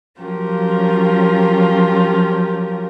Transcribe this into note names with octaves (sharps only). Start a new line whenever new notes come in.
F3 F#3 C#4 F4 G4 A#4